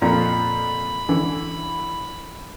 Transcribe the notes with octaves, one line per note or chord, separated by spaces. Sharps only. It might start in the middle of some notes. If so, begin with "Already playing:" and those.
F2 A#2 F4 B5
D3 E3